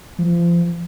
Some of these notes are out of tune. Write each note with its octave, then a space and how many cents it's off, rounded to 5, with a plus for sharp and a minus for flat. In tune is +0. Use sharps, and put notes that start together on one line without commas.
F3 -30